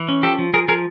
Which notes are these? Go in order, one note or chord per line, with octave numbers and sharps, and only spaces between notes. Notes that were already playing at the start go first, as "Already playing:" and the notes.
Already playing: E3
C#4
F3 G4 A4
F3
F3 G#4 A#4
F3 G#4 A#4